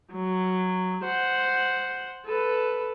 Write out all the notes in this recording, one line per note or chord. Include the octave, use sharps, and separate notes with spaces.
F#3
C5 F#5
A4 B4